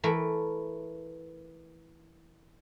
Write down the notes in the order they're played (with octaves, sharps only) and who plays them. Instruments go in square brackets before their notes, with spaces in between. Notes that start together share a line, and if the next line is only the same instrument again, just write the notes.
[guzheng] E3 A3 A#4